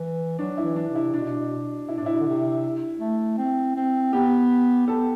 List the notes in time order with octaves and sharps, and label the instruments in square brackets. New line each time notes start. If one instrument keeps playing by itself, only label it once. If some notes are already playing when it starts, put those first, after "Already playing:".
Already playing: [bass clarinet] E3
[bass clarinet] F#3 [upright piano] D4
[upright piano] E4
[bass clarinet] E3
[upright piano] D4
[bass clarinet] C3
[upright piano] E4
[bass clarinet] B2 [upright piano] D4
[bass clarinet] B2
[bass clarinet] B2 [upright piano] E4
[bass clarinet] A2 [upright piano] D4
[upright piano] E4
[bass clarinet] B2
D3
C3
A3
C4
C4
[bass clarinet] B3 [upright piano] G4
[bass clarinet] B3 [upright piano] A4